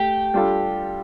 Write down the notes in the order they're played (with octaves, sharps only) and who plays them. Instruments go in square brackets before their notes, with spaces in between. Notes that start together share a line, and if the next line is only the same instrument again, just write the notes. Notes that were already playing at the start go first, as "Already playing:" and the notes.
Already playing: [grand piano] A3 [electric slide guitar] G4
[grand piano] G3 D4 F4 A4